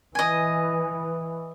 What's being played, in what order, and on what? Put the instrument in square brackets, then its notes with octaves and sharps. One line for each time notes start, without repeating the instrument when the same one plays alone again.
[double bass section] E3 [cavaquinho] D#5 G#5